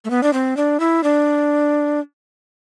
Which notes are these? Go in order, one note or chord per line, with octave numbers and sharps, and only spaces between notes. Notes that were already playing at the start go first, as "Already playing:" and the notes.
A3
B3
D4
C4
D4
E4
D4